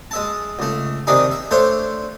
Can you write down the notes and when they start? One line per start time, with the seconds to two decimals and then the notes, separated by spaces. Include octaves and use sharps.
0.11 G#3 E5 A5
0.59 C#2 A3
1.07 C3 D#3 D4 D#4 G#4
1.31 E5
1.51 A3 D4 C5 C#5 E5